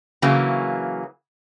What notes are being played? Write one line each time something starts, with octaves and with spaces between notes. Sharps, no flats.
C#3 E3 F#3 A#3